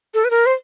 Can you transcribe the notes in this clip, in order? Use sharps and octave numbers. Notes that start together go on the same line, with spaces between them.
A4
B4
A#4
C5